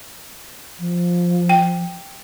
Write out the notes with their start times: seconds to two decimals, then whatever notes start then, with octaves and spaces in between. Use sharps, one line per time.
0.79 F3
1.49 G5